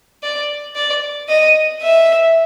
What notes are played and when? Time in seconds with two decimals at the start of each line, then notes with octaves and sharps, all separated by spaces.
0.23 D5
0.76 D5
1.29 D#5
1.82 E5